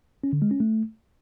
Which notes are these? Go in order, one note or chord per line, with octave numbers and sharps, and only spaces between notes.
C#4
D3
G#3
C#4
A3